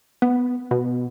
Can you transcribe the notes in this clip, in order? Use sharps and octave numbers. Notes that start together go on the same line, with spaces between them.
B3
B2